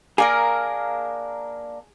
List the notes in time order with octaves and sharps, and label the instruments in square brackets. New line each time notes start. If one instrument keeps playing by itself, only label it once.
[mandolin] A#3 D4 A#4 [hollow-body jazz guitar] G#4